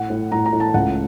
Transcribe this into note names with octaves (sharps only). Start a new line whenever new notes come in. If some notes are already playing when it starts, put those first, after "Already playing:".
Already playing: A2 F#5
A2
A2 A#5
A#5
A2
A5
C#2 F#5